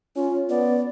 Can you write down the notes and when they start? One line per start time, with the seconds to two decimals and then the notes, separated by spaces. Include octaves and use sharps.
0.16 C#4 F4
0.49 B3 D5